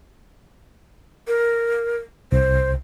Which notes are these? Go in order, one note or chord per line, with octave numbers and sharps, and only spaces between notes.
A#4
C2 C5